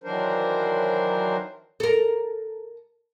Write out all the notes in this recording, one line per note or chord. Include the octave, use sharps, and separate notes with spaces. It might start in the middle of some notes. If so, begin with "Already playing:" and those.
D#3 E3 F#3 D4 A#4 C5
A4 A#4